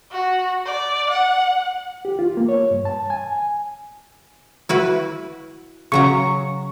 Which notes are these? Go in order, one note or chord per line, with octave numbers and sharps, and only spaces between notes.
F#4
D5
F#5
G4
F4
A#3
C#5
G2
A5
G#5
E4 F#4 B4
C#3 F#3 A#5 C#6